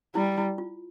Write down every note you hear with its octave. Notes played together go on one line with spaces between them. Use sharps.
G3 E4
E4
F4